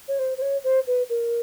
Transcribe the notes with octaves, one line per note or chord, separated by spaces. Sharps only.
C#5
C5
C5
C#5
C5
B4
A#4